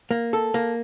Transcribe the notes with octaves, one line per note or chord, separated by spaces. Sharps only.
A#3
A4
A#3